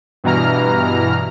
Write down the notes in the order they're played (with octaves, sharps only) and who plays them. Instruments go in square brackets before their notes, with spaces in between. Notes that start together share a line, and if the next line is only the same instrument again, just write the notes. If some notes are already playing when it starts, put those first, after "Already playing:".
[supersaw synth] G2 B2 E3 A#5 F6